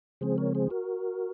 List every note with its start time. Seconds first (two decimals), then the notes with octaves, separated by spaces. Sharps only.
0.21 C#3 F3 G#3 C4 G#4 C5
0.38 A#4 C#5
0.55 G#4 C5
0.70 F#4 A#4